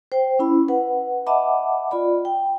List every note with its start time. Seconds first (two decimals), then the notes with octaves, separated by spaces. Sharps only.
0.12 C5 G5
0.39 C#4 E4 B5
0.68 B4 F#5
1.27 D#5 E5 F#5 A5 B5 D6
1.91 F4 D5 B5
2.25 G5